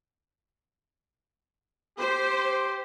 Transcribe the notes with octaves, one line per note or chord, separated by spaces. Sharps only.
G4 C5